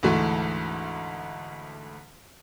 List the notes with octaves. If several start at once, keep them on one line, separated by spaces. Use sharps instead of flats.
D2 G#2 E3 A3